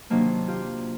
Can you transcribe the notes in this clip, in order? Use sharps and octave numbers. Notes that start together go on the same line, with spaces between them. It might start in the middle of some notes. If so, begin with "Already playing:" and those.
C3 D#3 F#3 A#3 D4
F4 G4